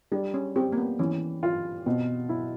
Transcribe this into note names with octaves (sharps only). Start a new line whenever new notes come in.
G3 D4
C#4
C4 G4
A#3
B3
E3 C#4
F4
B2 C4
E4